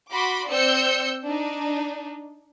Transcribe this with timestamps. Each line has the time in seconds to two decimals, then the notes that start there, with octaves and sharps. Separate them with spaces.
0.10 F#4 B5 C6 D6
0.47 C4 D5 E6 G6 C#7
1.24 D4 D#4